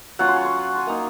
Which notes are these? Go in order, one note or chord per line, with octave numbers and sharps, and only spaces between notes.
F#3 C#4 F4 F#5
C6
C#6
C6
G#5
A#3 D#4 A#5